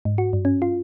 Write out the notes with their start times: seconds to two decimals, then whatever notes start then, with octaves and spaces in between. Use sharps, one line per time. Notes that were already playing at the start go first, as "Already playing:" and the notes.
0.05 G#2
0.18 F#4
0.33 G2
0.45 C#4
0.62 F4